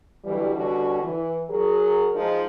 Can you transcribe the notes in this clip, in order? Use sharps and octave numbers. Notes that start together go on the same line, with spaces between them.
B2 D3 E3 F#3 G3
B2 D3 G3 C#4 D4 F#4
E3
F#3 G#4 A#4
F3 G#3 D#4